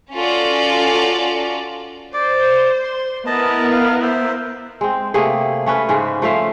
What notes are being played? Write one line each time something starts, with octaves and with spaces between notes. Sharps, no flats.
C#4 F4 F#4 A4 D5
C5 D5
C6
B3 E4 A#4 D#5 A5
F5
C5 E5
G#3 C4
C3 A3 A#3 G#4
A3 C#4 B4
G#2 C#3 G#3
F3 A3 E5 F5